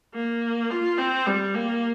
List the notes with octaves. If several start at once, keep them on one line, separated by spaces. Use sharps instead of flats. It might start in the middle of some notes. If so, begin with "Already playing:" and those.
A#3
F4
C4
G3
A#3